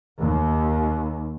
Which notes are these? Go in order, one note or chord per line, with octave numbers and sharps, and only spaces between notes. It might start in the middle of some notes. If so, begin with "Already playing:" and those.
D#2